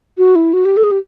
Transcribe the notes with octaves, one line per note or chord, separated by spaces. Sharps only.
F#4
E4
F#4
G4
A4
G#4
G4